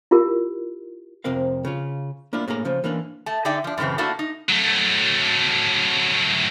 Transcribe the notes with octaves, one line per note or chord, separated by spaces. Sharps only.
E4 F4 G4 A#4
F2 C3 C4 A#4 F5
C#3 F4
A#3 D4 E4 F4
A2 A#3 G#4 F5 A#5
C#3 F3 C#4
E3 A#3 C#4 D4
A3 A5
D3 D#4 G#4 D5 E5 G5
F3 D4
F#2 A2 C#3 E3 C4
A3 A#3 D4 E4 F#4
D#4
F#3 A3